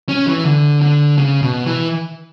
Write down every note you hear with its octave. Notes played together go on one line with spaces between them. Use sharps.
C#4
E3
D3
D3
C#3
B2
E3